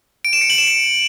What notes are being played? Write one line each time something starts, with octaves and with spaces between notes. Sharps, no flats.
D7
E7
C#7
F#7
E7